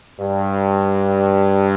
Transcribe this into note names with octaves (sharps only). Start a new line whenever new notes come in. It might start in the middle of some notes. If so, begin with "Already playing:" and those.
G2